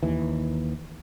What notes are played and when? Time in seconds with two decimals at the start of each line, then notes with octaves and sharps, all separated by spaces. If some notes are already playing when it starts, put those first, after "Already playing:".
0.03 D#2 E3